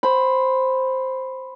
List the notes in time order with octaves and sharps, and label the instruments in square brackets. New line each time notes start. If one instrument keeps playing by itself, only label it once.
[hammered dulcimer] C5 B5